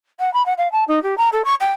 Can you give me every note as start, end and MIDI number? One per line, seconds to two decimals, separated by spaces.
0.19 0.32 78
0.33 0.44 83
0.46 0.53 78
0.58 0.70 77
0.72 0.84 81
0.88 1.02 63
1.03 1.17 67
1.18 1.29 82
1.32 1.42 69
1.44 1.54 85
1.60 1.72 79